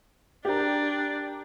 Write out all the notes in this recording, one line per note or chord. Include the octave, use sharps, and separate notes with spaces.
D4 G4 A#4